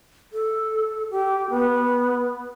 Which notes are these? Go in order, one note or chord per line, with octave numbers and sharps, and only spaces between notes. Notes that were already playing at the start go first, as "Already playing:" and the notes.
A4
G4
B3